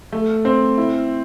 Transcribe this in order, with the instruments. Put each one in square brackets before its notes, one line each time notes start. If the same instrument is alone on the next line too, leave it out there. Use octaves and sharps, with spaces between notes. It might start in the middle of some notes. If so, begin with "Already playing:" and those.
[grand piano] A3
C4
E4